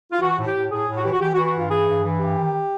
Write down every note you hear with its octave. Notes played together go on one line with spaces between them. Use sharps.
F4
E3 F#4
A2
G4
A2
A2 G#4
A2
F#4
E3 G4
F#4
E3 G4
F#4
E3
F#4
G2 F4
E3 G#4
G2
E3
G2 G4
D#3